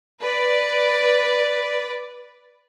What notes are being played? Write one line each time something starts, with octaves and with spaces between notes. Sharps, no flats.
B4 D5